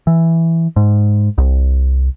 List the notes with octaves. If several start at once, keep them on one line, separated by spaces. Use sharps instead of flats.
E3
G#2
C2